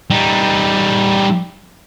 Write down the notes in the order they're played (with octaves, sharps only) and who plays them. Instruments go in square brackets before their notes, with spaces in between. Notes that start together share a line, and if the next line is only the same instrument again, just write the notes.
[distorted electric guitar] G3 D#4